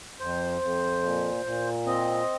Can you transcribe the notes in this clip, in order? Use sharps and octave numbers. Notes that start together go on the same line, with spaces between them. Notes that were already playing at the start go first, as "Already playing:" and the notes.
F2 C5
F2
A#2
A#2
C4 D#5